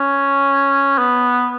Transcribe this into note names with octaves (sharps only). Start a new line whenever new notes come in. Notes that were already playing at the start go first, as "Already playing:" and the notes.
Already playing: C#4
B3